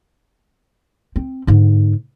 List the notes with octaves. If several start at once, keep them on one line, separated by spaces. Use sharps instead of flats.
C4
G#2 D3